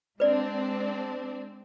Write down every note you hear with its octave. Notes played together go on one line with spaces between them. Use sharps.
G#3 C4 D4 B4 D5